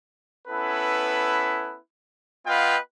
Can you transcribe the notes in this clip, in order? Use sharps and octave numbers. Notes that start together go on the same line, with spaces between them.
B3 C#4 E4 A4 B4
B3 F4 B4 D#5 F5 G5